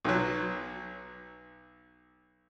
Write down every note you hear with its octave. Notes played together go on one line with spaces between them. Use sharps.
B1 F#3